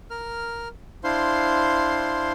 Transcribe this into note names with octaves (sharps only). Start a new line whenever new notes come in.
A#4 F6
D4 E4 C5 F5 C6